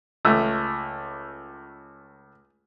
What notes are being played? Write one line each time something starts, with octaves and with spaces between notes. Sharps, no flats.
C#2 A3